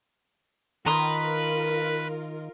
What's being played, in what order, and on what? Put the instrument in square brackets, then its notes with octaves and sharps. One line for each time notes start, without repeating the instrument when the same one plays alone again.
[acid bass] D#3 [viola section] F4 A#4 [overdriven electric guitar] B4 [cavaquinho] A#5 C6 D#6